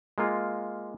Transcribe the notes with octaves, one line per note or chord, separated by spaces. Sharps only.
G#3 A#3 F4